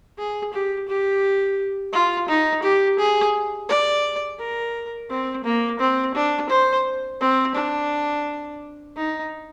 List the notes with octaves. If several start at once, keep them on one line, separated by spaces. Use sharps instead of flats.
G#4
G4
G4
F4
D#4
G4
G#4
D5
A#4
C4
A#3
C4
D4
C5
C4
D4
D#4